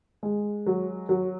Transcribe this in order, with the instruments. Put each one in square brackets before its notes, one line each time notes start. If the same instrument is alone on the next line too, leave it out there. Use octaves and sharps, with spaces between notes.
[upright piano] G#3
F#3
F#3